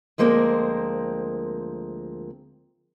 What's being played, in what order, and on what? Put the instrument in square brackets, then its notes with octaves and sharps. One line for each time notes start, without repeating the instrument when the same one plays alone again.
[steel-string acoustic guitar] D2 F3 G#3 A#3 C4 A#4